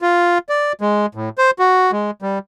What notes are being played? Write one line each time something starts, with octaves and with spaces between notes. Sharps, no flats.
F4
D5
G#3
A2
C5
F#4
G#3
G3